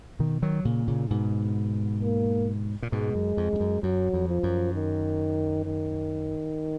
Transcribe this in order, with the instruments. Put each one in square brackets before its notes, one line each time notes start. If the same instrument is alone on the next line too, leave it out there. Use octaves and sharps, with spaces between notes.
[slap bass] B2 D#3
D#3 F#3
A#2 C#3
A#2 C#3
G#2 B2
[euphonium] A#3
[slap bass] A#2
[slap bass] G#2 B2 [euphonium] G#3
[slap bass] F#2
F2
F2
F#2
[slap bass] F#2 [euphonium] F#3
[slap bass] F2
[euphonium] F3
[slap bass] F#2
[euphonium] D#3
D#3